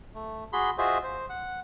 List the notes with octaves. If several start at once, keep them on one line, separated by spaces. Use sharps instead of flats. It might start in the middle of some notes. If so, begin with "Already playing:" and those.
A3
F#4 G#4 B5 C6
F4 F#4 G#4 C5 D#5 E5
C5
F#5